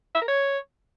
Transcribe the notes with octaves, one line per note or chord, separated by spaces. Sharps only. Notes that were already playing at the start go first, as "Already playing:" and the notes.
E5
A#4
C#5